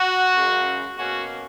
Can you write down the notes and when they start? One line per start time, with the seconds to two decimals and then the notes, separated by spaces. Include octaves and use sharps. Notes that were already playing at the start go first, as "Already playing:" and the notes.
Already playing: F#4
0.36 F#2 C#3 G#3
0.96 B2 A#3 C#4 F#4